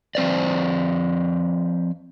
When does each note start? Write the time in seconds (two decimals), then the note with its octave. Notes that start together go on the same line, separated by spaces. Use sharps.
0.15 F3 C4 C5 D5